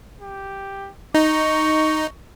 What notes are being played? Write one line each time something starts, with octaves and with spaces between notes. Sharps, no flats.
G4
D#4 C#6